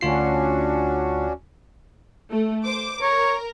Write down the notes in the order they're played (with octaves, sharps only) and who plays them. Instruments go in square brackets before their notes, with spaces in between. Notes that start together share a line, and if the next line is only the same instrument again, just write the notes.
[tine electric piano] D2 F4 C7 [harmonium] C#4 D4 F#4
[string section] A3
C5 D6
[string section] A#4 [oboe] C#5